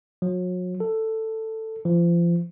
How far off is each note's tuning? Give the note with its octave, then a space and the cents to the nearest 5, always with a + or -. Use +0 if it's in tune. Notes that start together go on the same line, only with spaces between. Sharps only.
F#3 -35
A4 +10
F3 -30